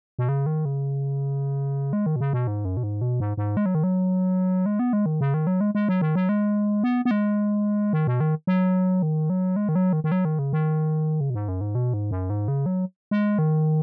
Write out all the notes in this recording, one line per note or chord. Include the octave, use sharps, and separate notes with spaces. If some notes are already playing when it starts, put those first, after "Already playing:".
B2
C#3
D#3
C#3
G#3
D#3
B2
C#3
B2
G#2
F#2
B2
G#2
B2
G#2
G#2
G#3
F#3
D#3
F#3
G#3
B3
G#3
D#3
C#3
D#3
F#3
G#3
G#3
F#3
D#3
F#3
G#3
B3
B3
G#3
D#3
B2
D#3
F#3
D#3
F#3
G#3
D#3
F#3
D#3
D#3
F#3
D#3
C#3
D#3
C#3
B2
G#2
F#2
G#2
B2
G#2
F#2
G#2
C#3
F#3
G#3
D#3